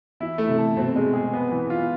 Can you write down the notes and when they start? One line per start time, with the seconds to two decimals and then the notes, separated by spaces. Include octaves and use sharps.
0.20 E3 E4
0.38 A3
0.48 C3
0.58 A4
0.77 B2 C4
0.96 G#3
1.14 G#4
1.33 B3
1.51 E3
1.70 F4